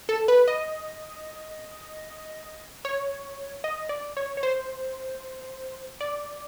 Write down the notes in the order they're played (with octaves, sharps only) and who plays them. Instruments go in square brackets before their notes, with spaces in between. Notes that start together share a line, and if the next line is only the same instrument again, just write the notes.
[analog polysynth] A4
B4
D#5
C#5
D#5
D5
C#5
C#5
C5
D5